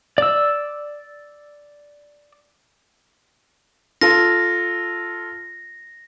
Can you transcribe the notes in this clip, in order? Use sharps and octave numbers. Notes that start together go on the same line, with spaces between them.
D5 E6
F4 A4 A#6